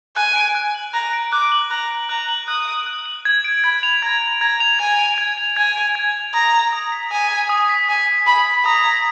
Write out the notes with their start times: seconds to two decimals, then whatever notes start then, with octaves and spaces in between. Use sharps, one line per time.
0.16 G#5 F#6
0.36 D7
0.55 F#6
0.74 F#7
0.94 A#5 F#6
1.13 D7
1.32 D6 F#6
1.52 F#7
1.70 A#5 F#6
1.90 D7
2.09 A#5 F#6
2.29 F#7
2.48 D#6 F#6
2.68 D7
2.86 F#6
3.06 F#7
3.25 G#6
3.44 D7
3.64 B5 G#6
3.83 F7
4.02 A#5 G#6
4.22 D7
4.41 A#5 G#6
4.60 F7
4.79 G#5 G#6
4.99 D7
5.18 G#6
5.38 F7
5.56 G#5 G#6
5.76 D7
5.95 G#6
6.15 F7
6.33 A#5 D#6
6.53 G#6
6.73 D#6
6.92 B6
7.11 G#5 D#6
7.31 G#6
7.49 D#6
7.69 B6
7.89 G#5 D#6
8.07 G#6
8.26 B5 D#6
8.47 B6
8.65 A#5 D#6
8.84 G#6